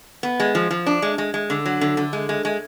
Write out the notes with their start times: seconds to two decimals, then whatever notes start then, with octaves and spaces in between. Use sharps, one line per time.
0.23 B3
0.40 G#3
0.55 F3
0.71 F3
0.86 D4
1.02 G#3
1.18 G#3
1.34 G#3
1.50 D3
1.66 F#3
1.81 D3
1.97 D3
2.13 G#3
2.29 G#3
2.45 G#3